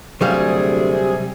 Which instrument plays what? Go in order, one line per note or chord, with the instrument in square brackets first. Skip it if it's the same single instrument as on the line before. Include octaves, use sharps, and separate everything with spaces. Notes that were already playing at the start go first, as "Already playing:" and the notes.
[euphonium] D2 [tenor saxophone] C3 [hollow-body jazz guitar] F#3 G3 F5 [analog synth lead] G#4